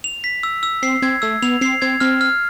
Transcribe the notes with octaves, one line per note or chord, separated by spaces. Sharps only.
F7
B6
E6
E6
C4 C7
C4 G#6
A3 E6
B3 F7
C4 C7
C4 G#6
C4 F6
F6